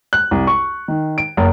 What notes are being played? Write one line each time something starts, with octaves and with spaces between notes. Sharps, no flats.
F#6
C2
C#6
D#3
D7
F#1